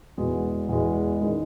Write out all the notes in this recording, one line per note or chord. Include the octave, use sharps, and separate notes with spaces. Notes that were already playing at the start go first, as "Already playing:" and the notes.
E2 B2 G#3
E2 B2 G#3
D#3 G#3 C#4